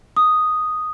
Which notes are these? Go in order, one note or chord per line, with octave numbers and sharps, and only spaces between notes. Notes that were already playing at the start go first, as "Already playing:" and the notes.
D#6